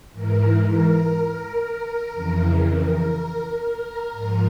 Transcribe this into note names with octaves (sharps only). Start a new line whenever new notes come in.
G#2 E3 A#4
A#4
F2 C#3 E3
A#4
A#4
G#2 F3